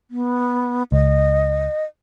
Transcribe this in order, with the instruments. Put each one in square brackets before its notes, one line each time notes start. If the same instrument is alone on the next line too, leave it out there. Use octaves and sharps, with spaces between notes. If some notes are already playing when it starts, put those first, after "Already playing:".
[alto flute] B3
[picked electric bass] C#2 [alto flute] D#5